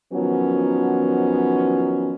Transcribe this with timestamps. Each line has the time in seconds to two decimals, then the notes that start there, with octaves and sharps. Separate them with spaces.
0.12 D#3 F3 F#3 B3 C#4